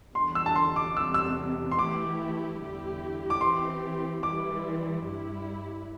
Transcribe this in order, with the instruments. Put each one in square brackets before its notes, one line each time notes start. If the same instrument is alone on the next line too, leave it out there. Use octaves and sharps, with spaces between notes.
[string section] E2 D3 G3 D4 [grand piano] C6
[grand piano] E6
A5
C6
D6
[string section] E2 C3 G3 [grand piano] E6
[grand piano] E6
C6
[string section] E3 A3 E4 G4 [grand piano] D6
[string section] E2 D3 G3 E4 G4
[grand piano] D6
[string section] E3 C4 E4 G4 [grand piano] C6
[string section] E3 G3 E4 [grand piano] D6
[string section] G2 G3 E4